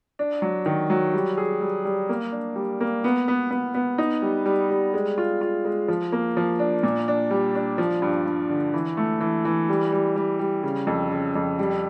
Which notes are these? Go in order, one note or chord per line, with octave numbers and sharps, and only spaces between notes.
D4
F#3
D#3
F#3
G3
G#4
G3
G3
A#3
D4
G3
A#3
B3
B3
B3
B3
D#4
G3
G3
G3
G#3
F4
F4
G#3
F3
A#3
F3
D4
A#2
D4
G3
D4
F3
G2
G2
D3
E3
A3
E3
E3
G3
G3
G3
G3
C#3
F2
C#3
F2
G3